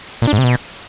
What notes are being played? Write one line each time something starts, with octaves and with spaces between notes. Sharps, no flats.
A#2
D4
G#2
C3
B2